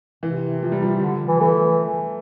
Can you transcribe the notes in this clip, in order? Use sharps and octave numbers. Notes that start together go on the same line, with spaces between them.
C3 E3
F3
G3
F3
D3
E3
E3 A3